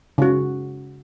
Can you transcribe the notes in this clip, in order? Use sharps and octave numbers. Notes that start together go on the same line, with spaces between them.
C#3 F#4